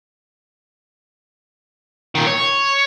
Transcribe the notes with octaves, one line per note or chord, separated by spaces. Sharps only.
A#2 D#3
C#5